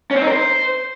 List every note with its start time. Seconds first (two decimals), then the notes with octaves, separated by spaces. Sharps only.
0.11 C#4
0.16 C4
0.22 D#4
0.27 A#4
0.32 C5